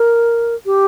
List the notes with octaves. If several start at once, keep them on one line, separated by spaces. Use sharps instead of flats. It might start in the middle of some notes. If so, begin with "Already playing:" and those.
Already playing: A#4
G4